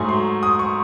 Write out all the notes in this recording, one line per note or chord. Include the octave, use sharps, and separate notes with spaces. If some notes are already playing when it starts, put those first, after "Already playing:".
Already playing: G#2 F#3 A3 G#5
C6
D#6
C#6